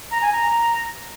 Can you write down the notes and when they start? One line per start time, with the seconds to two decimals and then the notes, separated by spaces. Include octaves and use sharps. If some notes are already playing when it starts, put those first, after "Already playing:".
0.11 A#5
0.22 G#5
0.33 A#5